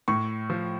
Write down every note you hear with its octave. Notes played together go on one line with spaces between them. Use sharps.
A2 C#6
F3